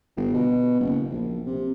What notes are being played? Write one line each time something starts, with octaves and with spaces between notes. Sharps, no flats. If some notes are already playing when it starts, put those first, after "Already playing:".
G1
B2
F#1
A#1
C3